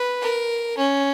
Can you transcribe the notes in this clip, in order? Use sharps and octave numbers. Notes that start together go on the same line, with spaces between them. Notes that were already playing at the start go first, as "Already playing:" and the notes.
Already playing: B4
A#4
C#4